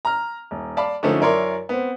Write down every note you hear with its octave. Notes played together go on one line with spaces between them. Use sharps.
A#5 F6
D#1
D5 F5 A5 B5
D3 F3 A3 C#4 D#4
F#2 E4 A#4 C#5 D5 C6
B3 C4